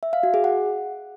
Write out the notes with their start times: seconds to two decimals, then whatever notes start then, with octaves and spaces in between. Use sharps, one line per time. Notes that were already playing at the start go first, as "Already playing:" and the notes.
0.03 E5
0.13 F5
0.23 F#4
0.34 G#4
0.44 F#5